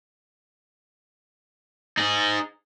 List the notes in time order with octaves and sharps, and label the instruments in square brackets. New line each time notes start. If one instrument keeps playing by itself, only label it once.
[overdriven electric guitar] D#4 G#4